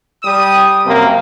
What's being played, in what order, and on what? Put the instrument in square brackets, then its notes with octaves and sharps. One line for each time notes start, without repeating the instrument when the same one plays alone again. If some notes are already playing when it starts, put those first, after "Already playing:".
[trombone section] G3 [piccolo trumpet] D#6
[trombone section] F#2 C3 A#3 [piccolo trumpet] G5